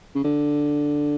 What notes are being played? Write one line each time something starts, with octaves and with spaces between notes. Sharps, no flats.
C#3
D3